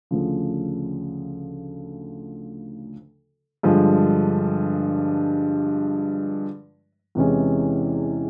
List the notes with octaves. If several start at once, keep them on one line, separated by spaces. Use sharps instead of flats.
D2 C#3 F3
G2 D3 F3 G#3
E2 C3 E3 G#3 C#4